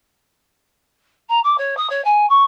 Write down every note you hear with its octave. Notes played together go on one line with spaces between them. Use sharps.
A#5
D6
C#5
D#6
C#5
G#5
C#6